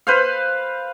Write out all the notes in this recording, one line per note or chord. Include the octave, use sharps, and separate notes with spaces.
B4 C5 F5